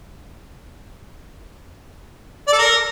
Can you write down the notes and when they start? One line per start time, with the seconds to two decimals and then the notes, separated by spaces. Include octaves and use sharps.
2.47 D5
2.53 A4
2.58 A#4